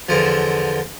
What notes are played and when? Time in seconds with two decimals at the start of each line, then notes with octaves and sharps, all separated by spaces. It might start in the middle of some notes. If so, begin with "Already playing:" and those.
0.09 E2 D3 F3